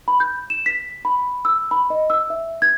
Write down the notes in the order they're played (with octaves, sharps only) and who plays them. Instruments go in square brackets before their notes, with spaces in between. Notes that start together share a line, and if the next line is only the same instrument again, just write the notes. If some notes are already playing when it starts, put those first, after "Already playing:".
[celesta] B5
G6
E7
B6
B5
E6
B5
D#5
E6
E5
G#6